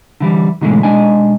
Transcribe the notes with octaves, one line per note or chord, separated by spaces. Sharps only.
D3 E3 G3
G#2 B2 D3 E3 G#3 A3
B1 G#2 G#3 D4 D#5 G#5